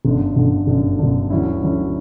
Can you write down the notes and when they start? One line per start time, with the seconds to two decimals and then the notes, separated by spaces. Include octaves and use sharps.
0.05 G1 F#2 D3
0.36 G1 F#2 D3
0.67 G1 F#2 D3
0.99 G1 F#2 D3
1.30 D2 D3 F#3 C#4 E4
1.62 D2 D3 F#3 C#4 E4